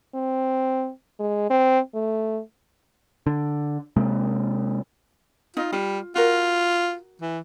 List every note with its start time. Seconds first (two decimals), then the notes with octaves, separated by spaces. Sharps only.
0.15 C4
1.20 G#3
1.50 C4
1.94 A3
3.27 D3
3.97 C3 G#3 A#3
5.57 D#4 F4 D#5
5.73 G3 F4
6.16 F4 F#4 A#4
7.22 E3